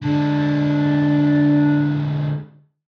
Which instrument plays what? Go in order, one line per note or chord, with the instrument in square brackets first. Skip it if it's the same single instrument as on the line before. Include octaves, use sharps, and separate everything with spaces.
[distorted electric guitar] D3 G#3 [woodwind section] D4